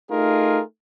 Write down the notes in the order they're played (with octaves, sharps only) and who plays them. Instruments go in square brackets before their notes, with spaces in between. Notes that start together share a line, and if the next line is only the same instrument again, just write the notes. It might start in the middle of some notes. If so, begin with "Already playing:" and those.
[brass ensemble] A3 D#4 F4 G#4 A#4